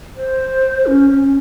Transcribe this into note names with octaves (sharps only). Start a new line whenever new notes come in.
C5
C#4
C#4
C#4